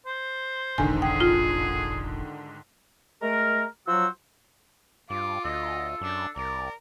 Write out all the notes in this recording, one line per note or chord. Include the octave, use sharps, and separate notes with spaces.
C5
E1 A1 G#2 D3 D#3 G#5
G#4 G5
F4
G#3 A3 A#4
F3 F#3 F#4 C5 E6
G2 F4 D6
D2 A4 D#5
F#2 D4
C2 A#4 D5